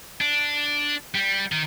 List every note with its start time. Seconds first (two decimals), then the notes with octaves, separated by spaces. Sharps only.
0.21 D4
1.15 G3
1.52 D#3